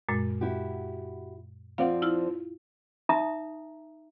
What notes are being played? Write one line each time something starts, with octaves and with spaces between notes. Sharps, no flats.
F#2 A#2 G#3
E4 F#4 G4
F3 C4 D5 F5 F#5
E4 F4 E6
D#4 E5 A#5 D#6